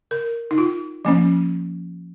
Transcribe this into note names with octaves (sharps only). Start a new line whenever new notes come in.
A#4
D#4
F4
F3 A#3 C#4